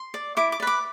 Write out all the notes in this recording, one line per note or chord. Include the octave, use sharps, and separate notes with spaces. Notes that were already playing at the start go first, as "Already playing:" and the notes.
Already playing: C6
D5
E4 D6
D6
D5
B4 D6